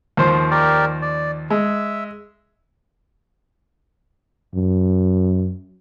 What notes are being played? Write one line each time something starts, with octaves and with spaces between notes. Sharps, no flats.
D#2 F3 C5
G4 A#4 D5
D5
G#3 E5
F#2